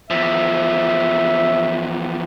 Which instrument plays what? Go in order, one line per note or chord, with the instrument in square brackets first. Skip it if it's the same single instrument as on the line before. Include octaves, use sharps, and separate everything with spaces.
[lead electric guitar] E2 F3 [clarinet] E5